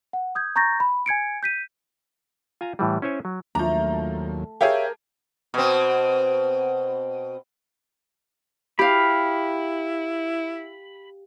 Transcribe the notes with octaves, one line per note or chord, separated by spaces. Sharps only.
F#5
D#6 G6 G#6
A#5 C#6 G6 A6 A#6
B5
G#5 G#6 C#7 D7
G6 B6 D#7
F4 G#5 A#5
A2 E3 G3
C#4 E4 C5 C#5 G#5
F#3
D#2 F3 F#3 A3 D4 A#5
G4 G#4 A#4 C#5 E5 F5
B2 C4
E4 G4 F5 B5